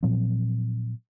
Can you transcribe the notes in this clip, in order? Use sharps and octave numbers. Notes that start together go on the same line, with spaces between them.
A#2 F3 F#3 C4